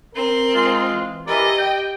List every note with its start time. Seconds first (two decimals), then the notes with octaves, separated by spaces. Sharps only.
0.14 C4 A#4 C6
0.54 G#3 F4
0.92 E3
1.27 E3 G4 A#4 D5 D#5
1.60 G5